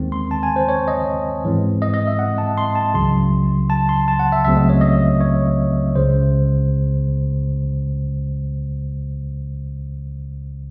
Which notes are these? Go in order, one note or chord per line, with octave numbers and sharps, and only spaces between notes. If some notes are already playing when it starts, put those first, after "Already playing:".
Already playing: D#2 D#3 G#3 C4
C6
A5
G#5
C5
C#5
D#5
G#2 E3 G#3 C4
D#5
D#5
E5
F#5
A5
C6
A5
C#2 C#3 F#3 C6
A5
C6
A5
F#5
E5
C#2 C#3 F#3 A3 C4 E5
D#5
C#5
D#5
C#5
C#2 C#3 G#3 C5